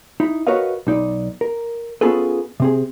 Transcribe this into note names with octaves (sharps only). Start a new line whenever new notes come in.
D#4 E4
F#4 A#4 B4 C#5 D#5 F5
B1 D#4 D5
A#4
B3 C#4 F4 G#4 A4 B4
C3 C4 G#4